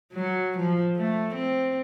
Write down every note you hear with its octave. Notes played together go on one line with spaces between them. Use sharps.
F#3
F3
A3
C4